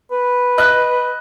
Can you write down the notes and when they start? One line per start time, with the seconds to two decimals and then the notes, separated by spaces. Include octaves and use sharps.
0.12 B4
0.58 D#5 F#6